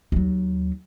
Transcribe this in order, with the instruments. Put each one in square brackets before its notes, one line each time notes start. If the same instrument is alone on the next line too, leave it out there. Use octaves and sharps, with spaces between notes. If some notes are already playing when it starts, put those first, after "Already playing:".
[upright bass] D#2 F#3